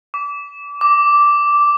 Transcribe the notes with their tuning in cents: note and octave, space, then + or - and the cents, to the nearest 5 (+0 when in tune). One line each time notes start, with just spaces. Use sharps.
D6 -30
D6 -5